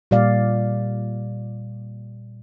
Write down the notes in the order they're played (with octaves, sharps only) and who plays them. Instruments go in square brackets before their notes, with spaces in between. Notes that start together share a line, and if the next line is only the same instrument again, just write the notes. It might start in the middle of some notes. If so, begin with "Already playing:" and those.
[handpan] A#2 G3 D5 F5